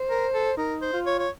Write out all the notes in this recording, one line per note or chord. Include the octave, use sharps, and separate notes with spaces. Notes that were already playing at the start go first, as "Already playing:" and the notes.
Already playing: C5
A#4
A4
D#4 A#4
C5
F4
C#5
C#5